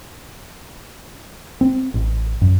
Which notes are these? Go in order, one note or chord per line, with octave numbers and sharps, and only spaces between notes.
C4
A1
F#2